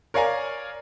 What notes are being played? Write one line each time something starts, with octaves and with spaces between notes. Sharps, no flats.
A#4 C#5 D5 F5 G#5 A#5